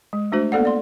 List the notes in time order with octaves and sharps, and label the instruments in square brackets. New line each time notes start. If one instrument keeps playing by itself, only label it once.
[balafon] G#3
A3 D4 F#4 C5
A#3 B3 A4 D5 F#5
D5 C6